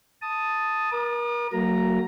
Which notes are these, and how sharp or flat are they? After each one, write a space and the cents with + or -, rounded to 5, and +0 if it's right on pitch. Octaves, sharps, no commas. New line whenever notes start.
A5 +0 D#6 +0
A#4 +35 D#6 -45
F#3 +0 A#3 -40 A#5 +0